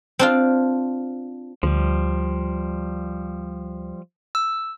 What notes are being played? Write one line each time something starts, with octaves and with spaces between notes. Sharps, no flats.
C4 D4 F4
D2 F3 G3
E6